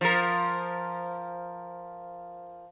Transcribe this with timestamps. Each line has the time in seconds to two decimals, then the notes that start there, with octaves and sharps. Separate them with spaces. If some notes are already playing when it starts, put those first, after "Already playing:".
0.01 F3 A#4